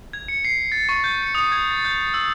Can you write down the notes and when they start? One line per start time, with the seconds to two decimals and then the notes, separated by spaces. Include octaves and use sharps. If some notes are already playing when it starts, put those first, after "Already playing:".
0.13 G#6
0.28 C#7
0.45 C7
0.72 A6
0.89 C#6
1.04 G6
1.22 C#7
1.35 D#6
1.52 G#6
1.70 A6
1.85 G6
2.14 E6